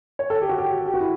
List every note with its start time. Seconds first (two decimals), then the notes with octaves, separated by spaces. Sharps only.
0.19 C#5
0.30 A4
0.42 G4
0.49 F#4
0.58 G4
0.86 G4
0.94 F#4
1.00 E4